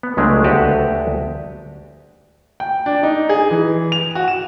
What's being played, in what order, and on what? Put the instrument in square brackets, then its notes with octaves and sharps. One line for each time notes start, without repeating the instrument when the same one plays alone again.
[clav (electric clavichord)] B3
C#2 F#3 G#3 A3 D4
D2 F#4 G4 B4 A5 A#5
[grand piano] G5
D4
D#4
G#4
E3
F7
F#4
E7